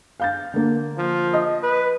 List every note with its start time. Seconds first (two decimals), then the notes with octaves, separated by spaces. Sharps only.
0.20 F5 G6 A6
0.54 D3 A#3
0.98 F3
1.34 D#5
1.63 B4